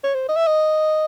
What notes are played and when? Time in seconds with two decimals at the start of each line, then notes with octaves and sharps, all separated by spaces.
0.04 C#5
0.15 C5
0.29 D#5
0.36 E5
0.47 D#5